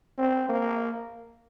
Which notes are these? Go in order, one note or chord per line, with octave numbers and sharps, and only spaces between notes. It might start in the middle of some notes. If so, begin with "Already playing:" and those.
C4
A#3